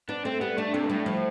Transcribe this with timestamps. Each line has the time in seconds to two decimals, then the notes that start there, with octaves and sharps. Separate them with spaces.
0.09 B3 D4
0.25 A3 C4
0.41 G3 B3
0.57 A3 D4
0.74 C3 A3
0.85 G2
0.90 A2 G3
1.06 F3